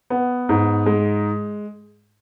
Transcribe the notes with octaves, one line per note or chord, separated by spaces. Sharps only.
B3
G#2
G#3